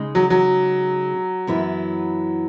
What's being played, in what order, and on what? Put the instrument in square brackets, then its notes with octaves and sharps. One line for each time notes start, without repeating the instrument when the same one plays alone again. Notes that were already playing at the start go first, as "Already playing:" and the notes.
Already playing: [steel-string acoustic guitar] C#3 G#3 D#4
[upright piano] F#3
F#3
[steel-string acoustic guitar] F#2 E3 B3 E4